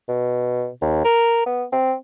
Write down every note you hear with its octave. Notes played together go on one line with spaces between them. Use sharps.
B2
D#2
A#4
B3
C4